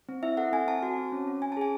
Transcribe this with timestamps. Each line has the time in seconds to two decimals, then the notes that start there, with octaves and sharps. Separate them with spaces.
0.09 C4
0.23 E4 E5
0.37 A4 F#5
0.53 C4 G#5
0.67 C4 A5
0.83 F#4
0.97 C4
1.12 C#4
1.27 C#4
1.42 C#4 G#5
1.52 A5
1.57 G#4 G#5